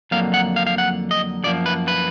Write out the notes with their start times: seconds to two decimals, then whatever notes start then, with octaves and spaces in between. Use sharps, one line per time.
0.11 F2 D3 F#3 A#3 F5
0.34 F#5
0.56 F5
0.67 F5
0.78 F#5
1.11 D#5
1.44 F#2 F3 A#3 D5
1.66 B4
1.88 B4